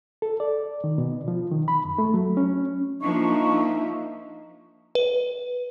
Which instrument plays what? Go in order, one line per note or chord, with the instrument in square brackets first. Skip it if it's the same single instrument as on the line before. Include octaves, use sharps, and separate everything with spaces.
[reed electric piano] A4
D5
D#3
B2
F3
D#3
B5
F#2
A3
F#3
C#4
[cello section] F3 A#3 E5 [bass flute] D4 [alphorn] D#4 [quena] C#6
[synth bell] B4